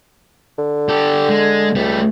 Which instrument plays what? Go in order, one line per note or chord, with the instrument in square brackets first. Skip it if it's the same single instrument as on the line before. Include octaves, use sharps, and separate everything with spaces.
[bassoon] D3
[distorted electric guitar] G4 A4
G#3
[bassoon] C#2 [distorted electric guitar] G3 A3